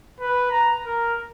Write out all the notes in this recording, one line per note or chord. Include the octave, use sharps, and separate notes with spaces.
B4
A#5
A#4